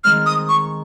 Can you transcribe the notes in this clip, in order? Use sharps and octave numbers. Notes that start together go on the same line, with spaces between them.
D#3 G#3 C4 F6
D#6
C#6